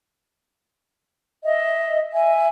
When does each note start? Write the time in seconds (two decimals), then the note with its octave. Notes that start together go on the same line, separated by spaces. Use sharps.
1.44 D#5 E5
2.12 E5 G#5